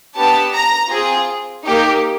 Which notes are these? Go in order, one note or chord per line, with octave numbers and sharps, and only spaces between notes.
B3 D4 G4 A5
A#5
C4 F4 G#4
A#3 D#4 G4